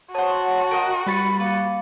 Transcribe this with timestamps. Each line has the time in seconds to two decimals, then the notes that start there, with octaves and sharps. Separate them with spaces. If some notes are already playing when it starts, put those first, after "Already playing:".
0.15 F#4 C5 C#5 F#5 A5 D#6
0.71 A#4 D#5 F#5 G5
1.06 G3 B4 B5 A6 C#7
1.40 A#3 B4